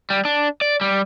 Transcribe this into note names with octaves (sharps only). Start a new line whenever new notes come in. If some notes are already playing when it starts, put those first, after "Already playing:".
G3
D4
D5
G3